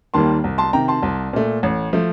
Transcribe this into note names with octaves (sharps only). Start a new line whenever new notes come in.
D#2 D#3 G3 A#3 A5 C6
C2
A5 C6
C3 D#3 G5 A#5
A5 C6
C2
A#2 A3
A1
F3 A3